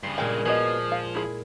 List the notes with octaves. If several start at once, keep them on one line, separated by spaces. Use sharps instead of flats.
G2 C#3 C6
A#2 G#3 G5
F3 B3 F#4 G#4 D#5
F5
E4 G#4